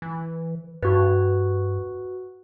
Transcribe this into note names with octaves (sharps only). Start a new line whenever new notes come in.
E3
G2 F#4 B4